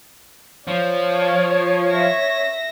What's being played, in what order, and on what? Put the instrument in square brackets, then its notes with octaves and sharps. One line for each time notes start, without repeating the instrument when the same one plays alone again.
[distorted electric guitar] F3 [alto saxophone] C#5 [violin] D5
[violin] E5 A#6